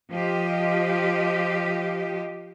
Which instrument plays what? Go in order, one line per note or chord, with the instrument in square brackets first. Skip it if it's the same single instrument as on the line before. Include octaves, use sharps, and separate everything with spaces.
[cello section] F3 G4 D#5